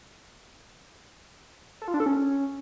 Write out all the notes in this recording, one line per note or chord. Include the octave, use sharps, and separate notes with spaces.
A4
F4
D4
A4
C#4